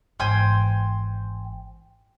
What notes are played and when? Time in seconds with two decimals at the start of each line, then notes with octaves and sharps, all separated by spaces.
0.20 G#1 E3 C5 G5 G#5